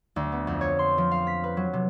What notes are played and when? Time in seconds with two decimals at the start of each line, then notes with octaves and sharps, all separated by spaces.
0.16 D2
0.32 B3
0.47 F2
0.61 C#5
0.79 C6
0.98 F3
1.11 F5
1.27 B6
1.44 B4
1.57 F#3
1.73 C3